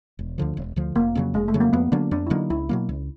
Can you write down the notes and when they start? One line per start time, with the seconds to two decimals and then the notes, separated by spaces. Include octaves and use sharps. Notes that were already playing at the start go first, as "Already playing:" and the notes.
0.19 E1
0.38 D2 D3 F3
0.57 E1
0.76 D2 D3 F3
0.95 F1 A#3
1.15 F2 C#3 F#3
1.34 F1 G#3
1.48 A3
1.54 F2 C#3 F#3
1.60 A#3
1.73 F2 B3
1.92 D3 F#3 A#3 D4
2.11 F2 D4
2.27 E4
2.30 D3 F#3 A#3 D#4
2.50 C#2 E4
2.69 B2 F#3 A#3
2.89 C#2